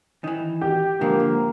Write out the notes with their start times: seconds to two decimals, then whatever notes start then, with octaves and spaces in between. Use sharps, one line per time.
0.24 D#3 E3
0.61 G4
1.01 G#2 D3 F3 A#3